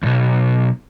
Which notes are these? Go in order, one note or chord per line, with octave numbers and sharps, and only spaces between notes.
B1 E2